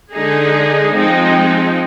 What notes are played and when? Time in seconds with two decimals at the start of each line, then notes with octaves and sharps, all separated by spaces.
0.13 D3 G#3 D#4 G#4
0.95 F3 G#3 C4 D#4